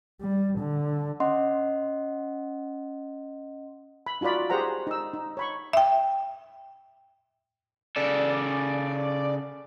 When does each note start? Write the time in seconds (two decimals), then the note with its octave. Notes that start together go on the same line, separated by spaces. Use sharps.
0.21 G3
0.59 D3
1.20 C#4 D#5 F#5 C6
4.07 B5
4.21 D#4 F4 F#4 D5 B5
4.50 G4 G#4 C5 F#5 A#5
4.87 D#4 E6
5.14 D#4
5.37 C#5 B5 C#6
5.73 E5 G5
7.96 C#3 A4 D5